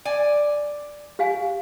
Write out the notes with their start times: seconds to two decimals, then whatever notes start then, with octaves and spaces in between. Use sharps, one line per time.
0.05 D5 G#5
1.19 G4 F5 G#5